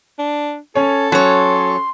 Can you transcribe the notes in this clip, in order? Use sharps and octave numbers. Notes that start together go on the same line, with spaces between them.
D4
C#4 A4 C#5
F#3 C#4 C#5 C6